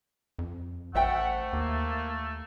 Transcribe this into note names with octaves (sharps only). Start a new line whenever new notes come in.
F2
A1 A3 C5 E5 F#5 G5
D#2 A#3